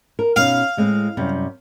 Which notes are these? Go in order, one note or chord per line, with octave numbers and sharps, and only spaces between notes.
A#4
B2 C#4 D#4 F5
A2 G#3 C4
F#2 C3 G3